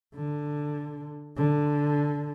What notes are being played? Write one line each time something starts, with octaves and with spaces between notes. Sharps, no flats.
D3
D3